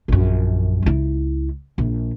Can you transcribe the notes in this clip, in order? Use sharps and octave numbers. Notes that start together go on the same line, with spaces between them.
A#1 F#2
C#2 E4
A#1